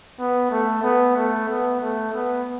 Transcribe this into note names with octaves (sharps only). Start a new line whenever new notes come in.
B3
A3
B3
A3
B3
A3
B3